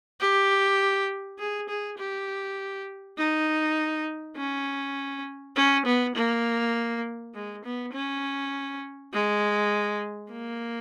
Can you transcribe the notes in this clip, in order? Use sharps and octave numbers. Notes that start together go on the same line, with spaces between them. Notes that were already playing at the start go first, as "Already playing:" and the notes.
G4
G#4
G#4
G4
D#4
C#4
C#4
B3
A#3
G#3
B3
C#4
G#3
A#3